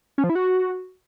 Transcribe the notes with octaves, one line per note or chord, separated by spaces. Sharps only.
C#4
F3
E4
F#4